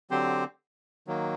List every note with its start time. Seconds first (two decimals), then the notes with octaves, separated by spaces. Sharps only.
0.10 D3 F#3 C4 G4 C5
1.07 D#3 F#3 A#3